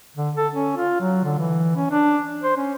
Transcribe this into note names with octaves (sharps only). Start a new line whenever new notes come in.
D3
A4
C#4
F4
F#3
D3
E3
C#4
D4
C5
C#4